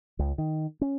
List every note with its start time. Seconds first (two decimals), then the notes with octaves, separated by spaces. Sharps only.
0.19 C#2
0.38 D#3
0.81 C#4